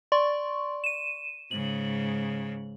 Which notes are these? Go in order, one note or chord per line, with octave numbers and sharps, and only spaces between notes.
D5 C6 C#6
D#7 E7
G#2 C#3 F#7